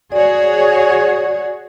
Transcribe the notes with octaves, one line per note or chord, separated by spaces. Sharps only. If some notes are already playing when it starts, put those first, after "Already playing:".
F#4 G#4 C#5 D5